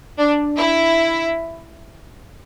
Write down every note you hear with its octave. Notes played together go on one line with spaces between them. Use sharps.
D4
E4